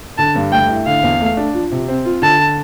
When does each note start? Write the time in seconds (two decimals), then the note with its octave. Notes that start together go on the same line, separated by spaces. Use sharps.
0.18 D3 A5
0.35 G2
0.52 A3 G5
0.70 E4
0.86 D3 F5
1.03 E2
1.21 A3
1.37 D4
1.54 F3
1.72 C3
1.88 C4
2.05 F4
2.22 D3 A5